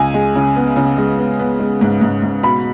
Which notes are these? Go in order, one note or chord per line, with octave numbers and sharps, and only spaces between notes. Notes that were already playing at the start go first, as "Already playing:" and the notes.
Already playing: C#2 G#5
G#3
C#3
B3
C#3
G#3
B3
B3
G#3
G#2
G#2
G#2
B2 B5